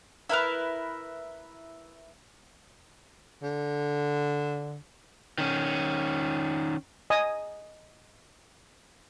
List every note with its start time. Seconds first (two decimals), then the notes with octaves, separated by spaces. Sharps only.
0.29 E4 A#4 B4 F6
3.42 D3
5.38 D#3 C#4
7.10 D#5 G#5 D#6